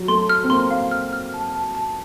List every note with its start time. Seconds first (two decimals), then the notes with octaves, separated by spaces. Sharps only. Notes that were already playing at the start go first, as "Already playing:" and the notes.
Already playing: F#3
0.08 A3 C6
0.29 F6
0.43 C4
0.50 A#3 C6
0.71 F5
0.91 F6
1.13 F6
1.34 A5
1.54 A5
1.75 A5